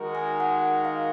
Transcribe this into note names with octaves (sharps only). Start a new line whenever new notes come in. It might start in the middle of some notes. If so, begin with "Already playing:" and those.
Already playing: D#3 G#3 D#4 F#4 A#4
G#5
F#5
F5